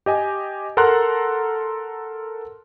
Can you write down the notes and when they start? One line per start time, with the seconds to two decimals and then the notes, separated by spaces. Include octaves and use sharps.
0.06 G4 D#5 G#5
0.77 A4 A#4 F#5 A#5 C6 F#6